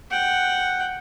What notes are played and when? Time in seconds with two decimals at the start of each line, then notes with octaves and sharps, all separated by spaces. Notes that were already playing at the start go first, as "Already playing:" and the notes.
0.11 F#5 G5